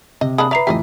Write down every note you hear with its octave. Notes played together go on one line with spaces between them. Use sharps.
C3 D#5
G#3 A#3 D4 B5 D#6
B4 D5 E5 A#5 B5 C7
F2 A2 E3 G4 C#5 D#5 E5